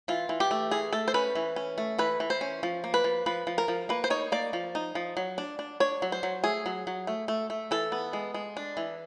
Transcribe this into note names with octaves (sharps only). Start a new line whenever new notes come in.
E3 F4
E3
G4
A3
E3 G#4
A3 A4
C5
C#4 B4
E3
C#4
A3
E3 B4
E3
C5
C#4
F3
A#3
B4
F3
F3 B4
F3
A#4
F3
A#3 B4
C5
D#4 C#5
A#3 D5
F3
D#4
F3
F#3
D4
D4
D4 C#5
F#3
C5
F#3
A3 G#4
F#3
F#3
A3
A3
A3
E3 A4
B3
G#3
G#3
D4
E3